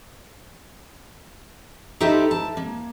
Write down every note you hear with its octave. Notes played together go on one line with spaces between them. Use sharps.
D#4 G4 A4 B4 C5 E5
A5
A#3